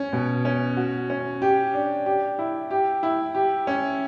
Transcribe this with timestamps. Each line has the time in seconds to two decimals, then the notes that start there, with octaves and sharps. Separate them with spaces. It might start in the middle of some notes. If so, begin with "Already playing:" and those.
Already playing: C#4
0.13 B2
0.45 C#4
0.77 F#4
1.10 C#4
1.42 G4
1.74 D4
2.06 G4
2.39 E4
2.71 G4
3.03 E4
3.35 G4
3.67 C#4